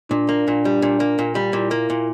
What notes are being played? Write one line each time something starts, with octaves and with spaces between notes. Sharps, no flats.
A#2 D4
A#3
A#2
G3
A#2
A#3
A#2
G3
A#2 E4
A#3
A#2